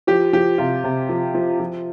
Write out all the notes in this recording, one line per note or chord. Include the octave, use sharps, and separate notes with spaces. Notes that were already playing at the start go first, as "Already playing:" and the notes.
F3 G4
F3 G4
C3 F4
C3
F3
F3
F3